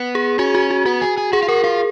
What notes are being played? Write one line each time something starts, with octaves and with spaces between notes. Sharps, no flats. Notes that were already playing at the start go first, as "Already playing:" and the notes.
Already playing: B3
G#4
C#4 F#4
F#4
F#4
B3 F#4
G#4
G#4
F#4 G#4
F4
F#4 A#4
F4 G#4